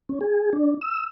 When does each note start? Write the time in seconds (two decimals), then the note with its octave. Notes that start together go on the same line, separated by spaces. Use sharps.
0.09 C#4
0.21 G#4
0.53 D4
0.81 E6